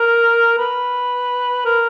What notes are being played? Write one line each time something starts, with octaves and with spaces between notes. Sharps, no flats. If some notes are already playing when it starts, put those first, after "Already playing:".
Already playing: A#4
B4
A#4